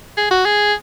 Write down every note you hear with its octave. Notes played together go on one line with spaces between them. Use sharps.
G#4
F#4
G#4